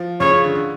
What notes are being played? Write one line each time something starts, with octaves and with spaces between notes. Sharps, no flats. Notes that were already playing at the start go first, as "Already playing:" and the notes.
Already playing: F3
C#3 C#5
C#3
D3
D3